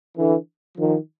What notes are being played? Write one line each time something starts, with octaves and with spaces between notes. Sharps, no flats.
D3 E3
D#3 F3